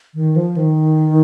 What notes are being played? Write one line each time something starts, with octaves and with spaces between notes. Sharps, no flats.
D#3
F3
D#3